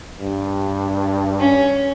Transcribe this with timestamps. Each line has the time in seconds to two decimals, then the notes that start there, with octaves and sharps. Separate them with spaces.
0.20 G2
1.40 C#4